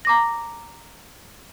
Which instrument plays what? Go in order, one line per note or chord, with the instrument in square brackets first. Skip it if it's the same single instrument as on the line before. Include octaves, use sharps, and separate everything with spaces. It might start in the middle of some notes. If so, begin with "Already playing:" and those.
[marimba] A#5 D6 A#6